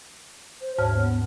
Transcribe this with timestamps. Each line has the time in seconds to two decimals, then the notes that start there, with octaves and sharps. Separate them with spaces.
0.61 C5
0.78 D#2 G#2 C#5 F6
0.95 B3